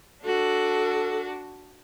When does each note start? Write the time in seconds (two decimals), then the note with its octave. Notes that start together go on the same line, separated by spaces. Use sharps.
0.24 D4 F#4 A4